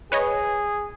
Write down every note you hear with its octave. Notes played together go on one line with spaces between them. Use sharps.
G#4 B4 C#5 D#5